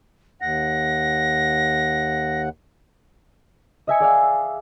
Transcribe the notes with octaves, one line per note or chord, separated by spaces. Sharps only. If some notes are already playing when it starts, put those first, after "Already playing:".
D#2 F#5 A#6
D#5 E5 G#5 C#7
G#4 D5 E5 F5